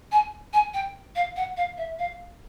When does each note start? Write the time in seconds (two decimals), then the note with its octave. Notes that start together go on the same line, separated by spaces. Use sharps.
0.12 G#5
0.53 G#5
0.74 G5
1.16 F5
1.36 F#5
1.57 F5
1.78 E5
1.99 F5